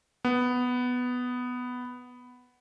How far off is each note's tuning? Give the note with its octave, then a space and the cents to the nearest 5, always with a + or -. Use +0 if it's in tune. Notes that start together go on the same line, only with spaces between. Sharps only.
B3 +5